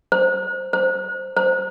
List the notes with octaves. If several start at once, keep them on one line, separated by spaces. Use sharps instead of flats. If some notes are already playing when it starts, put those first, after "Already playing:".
C5
C5
C5